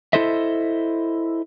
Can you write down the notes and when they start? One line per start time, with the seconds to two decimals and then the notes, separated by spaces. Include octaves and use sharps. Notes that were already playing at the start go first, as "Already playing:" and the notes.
0.13 E4 A4 C5 D#5 E5